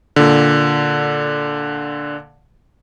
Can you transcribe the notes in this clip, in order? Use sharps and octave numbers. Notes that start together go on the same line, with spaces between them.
A#2 D3